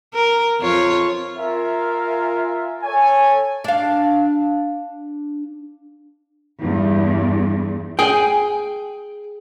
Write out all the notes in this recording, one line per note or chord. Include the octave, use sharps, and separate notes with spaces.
A#4
F2 F4 C#5
F4 A#4 E5 F5 G#5
A4 C#5 G#5
D4 F5
E2 G2
G#4 G5 G#5